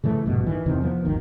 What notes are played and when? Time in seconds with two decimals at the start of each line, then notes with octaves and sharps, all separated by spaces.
0.04 C#3 E3 A3
0.26 A#1 G2 B2
0.47 D#3 E3
0.66 E2 C3 D#3
0.82 F3 B3
1.05 G#1 D#2 D#3